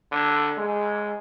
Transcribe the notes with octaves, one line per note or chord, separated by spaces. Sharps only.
D3
G#3